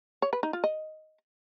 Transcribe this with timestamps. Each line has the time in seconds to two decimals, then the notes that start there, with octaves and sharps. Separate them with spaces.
0.22 C#5
0.33 B4
0.43 D#4
0.53 F4
0.64 D#5